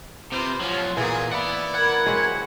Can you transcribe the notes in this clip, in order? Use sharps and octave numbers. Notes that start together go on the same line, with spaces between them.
C3 F4 B4 C5
F3 F#3 C#4 F4
A#2 E3 F#3 A#3 B3 G#4
E4 D5 F#5 B5
A#4 F#5 B5 G#6
C3 F#3 G#3 E4 C#5